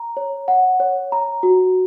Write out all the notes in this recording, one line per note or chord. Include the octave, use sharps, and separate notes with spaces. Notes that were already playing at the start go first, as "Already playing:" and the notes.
Already playing: A#5
C#5
F#5
C#5
A#5
F#4